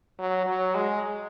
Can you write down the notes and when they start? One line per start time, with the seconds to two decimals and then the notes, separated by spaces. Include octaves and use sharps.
0.19 F#3
0.47 F#3
0.75 G#3